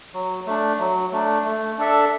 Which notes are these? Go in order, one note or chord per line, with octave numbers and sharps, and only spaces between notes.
F#3
A3 D4
F#3
A3 D4
A3
D4 A4 E5